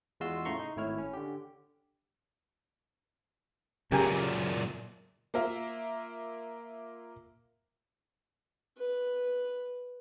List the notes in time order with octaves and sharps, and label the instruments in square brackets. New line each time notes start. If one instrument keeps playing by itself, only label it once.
[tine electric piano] E2 G#3 F4 F#4 C6 E6
A2 C#3 A3 A#5 C6 C#6
D#4
G#1 A2 E4 C#5 F6
C#4
D3 G4
[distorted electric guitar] F#2 A#2 [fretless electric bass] C#3 [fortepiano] G4 A#4 G#5
[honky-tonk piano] A#3 F4 A#4 E5 F5
[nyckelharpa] B4